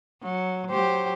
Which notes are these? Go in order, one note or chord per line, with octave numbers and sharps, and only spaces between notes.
F#3
F#3 G4 C5